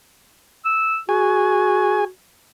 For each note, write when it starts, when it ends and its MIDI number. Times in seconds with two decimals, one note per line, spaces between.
0.65 0.99 88
1.09 2.08 66
1.09 2.05 68
1.09 2.05 80